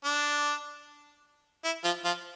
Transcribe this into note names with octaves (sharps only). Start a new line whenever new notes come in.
D4
E4
F3 F4
F3 F4